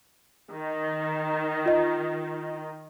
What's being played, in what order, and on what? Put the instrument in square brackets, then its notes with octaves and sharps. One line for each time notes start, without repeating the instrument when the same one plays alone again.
[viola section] D#3
[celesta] F4 D#5